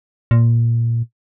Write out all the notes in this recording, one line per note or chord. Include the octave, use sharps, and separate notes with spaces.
A#2